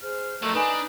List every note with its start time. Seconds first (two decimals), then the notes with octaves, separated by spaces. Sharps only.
0.02 G#4 C5 F6
0.42 F3 F#3 A3 A#4 D#5
0.54 D4 D#4 B4 G#5 B5